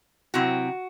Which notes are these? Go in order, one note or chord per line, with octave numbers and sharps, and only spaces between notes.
C3 F#3 C4 E4 F#4